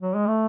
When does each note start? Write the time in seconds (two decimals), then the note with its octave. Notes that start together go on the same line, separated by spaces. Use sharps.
0.02 F#3
0.15 G#3
0.27 A3